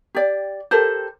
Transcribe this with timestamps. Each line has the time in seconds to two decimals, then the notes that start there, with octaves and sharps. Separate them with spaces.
0.15 G4 D5
0.71 G4 A4 A#4 C5